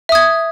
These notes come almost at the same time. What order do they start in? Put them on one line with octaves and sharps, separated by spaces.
E5 D#6 G#6